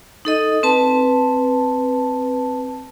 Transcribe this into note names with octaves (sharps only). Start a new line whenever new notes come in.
D#4 A4 D#5
C4 B4 A5